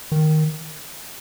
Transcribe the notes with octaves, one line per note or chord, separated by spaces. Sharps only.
D#3